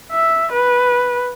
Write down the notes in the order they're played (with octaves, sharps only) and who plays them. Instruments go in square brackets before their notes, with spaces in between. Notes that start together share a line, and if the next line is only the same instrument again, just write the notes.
[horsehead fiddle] E5
B4